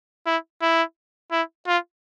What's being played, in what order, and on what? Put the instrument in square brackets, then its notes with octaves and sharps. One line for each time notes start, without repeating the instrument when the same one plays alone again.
[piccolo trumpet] E4
E4
E4
F4